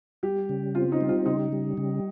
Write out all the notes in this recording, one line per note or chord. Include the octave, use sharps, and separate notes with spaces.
G3 G4
C#3
C4 F4
D#4
G3
F4
C#3 D#4
G3
C#3